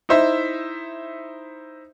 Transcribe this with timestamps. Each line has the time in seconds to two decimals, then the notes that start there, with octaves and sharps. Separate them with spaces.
0.09 D#4 E4 C5 E5